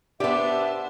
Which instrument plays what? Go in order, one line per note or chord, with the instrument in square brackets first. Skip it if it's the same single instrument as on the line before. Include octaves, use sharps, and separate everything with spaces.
[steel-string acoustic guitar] B3 D5 [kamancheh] D4 C5 [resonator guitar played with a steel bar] G4 [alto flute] E5